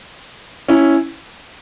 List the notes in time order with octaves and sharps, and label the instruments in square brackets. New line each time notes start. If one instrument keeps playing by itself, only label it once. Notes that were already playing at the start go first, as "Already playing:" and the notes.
[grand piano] C#4 E4